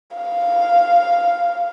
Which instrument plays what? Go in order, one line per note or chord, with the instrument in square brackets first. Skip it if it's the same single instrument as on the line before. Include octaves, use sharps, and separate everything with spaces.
[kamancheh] F5